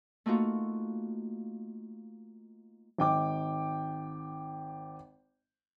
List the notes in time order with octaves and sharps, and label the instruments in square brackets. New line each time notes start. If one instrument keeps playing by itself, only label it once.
[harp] A3 A#3 D#4 F4 F#4
[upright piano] G#1 G5 D6